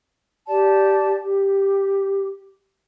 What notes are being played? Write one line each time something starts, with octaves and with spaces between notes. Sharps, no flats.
G4 D5 A5
G4